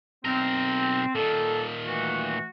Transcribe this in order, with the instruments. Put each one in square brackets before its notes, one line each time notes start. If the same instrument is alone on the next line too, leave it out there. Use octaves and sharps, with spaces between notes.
[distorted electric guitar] B1 A#4 [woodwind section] C4
[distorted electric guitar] A#2 D#3 [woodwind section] A4 A5
[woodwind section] E3 A3 F#4